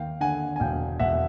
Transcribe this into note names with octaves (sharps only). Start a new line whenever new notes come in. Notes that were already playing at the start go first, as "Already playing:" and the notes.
Already playing: D#2 F5 G5
D3 F#5 G#5
G#5
E1 F5 G5
E1 E5 F#5